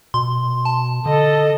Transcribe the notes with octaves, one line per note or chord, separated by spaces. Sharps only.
B2 C6
A5
D3 A4 D#5